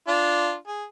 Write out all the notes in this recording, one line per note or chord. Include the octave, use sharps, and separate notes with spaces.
D4 F4
G#4